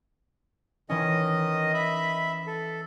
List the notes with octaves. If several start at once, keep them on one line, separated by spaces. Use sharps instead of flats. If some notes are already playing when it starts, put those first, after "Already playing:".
D#3 E3 C#4 D#5
E5 B5
A4